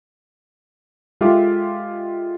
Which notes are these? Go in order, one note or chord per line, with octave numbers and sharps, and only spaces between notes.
G#3 F4 G4 A4 E5 D6